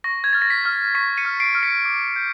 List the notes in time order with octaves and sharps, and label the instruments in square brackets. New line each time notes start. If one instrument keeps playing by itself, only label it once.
[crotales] C#6 A#6
G#6
F6 A6
A#6
B6
F6
C#6 B6
C#7 D#7
F6
C7 D7
F6
B6 C#7
D6
G6